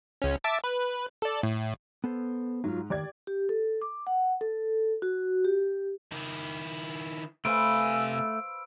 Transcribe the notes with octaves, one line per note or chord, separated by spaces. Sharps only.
C#2 C#4
E5 A5 D6
B4
A4 D5
A2
B3 A4 C5
G#2 F#3 F4
D#3 F3 G4 D5 G#6
G4
A4
D6
F#5
A4
F#4
G4
D#3 E4
C3 A3 B4 C5 F5 G#5 E6 D7